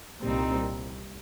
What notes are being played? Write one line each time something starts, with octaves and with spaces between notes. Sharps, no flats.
C2 A#2 G3 C4 D#4